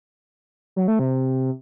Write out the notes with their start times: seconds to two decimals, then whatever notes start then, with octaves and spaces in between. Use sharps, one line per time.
0.76 F#3
0.88 A3
0.99 C3